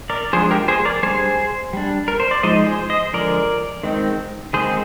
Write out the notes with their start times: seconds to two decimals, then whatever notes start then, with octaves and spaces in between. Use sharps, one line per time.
0.10 A#4 D5
0.33 F3 G#3 D4 G#4 C5
0.51 G4 A#4
0.68 G#4 C5
0.85 A#4 D5
1.03 G3 D4 G#4 C5
1.73 G3 D4
2.08 A#4
2.20 C5
2.31 D5
2.43 F3 G#3 D#4 C5 D#5
2.66 G#4 C5
2.90 C5 D#5
3.13 D3 F3 G#3 A#4 D5
3.83 D#3 G#3 C4 D#4
4.53 D#3 G#3 C4 D#4 G#4 C5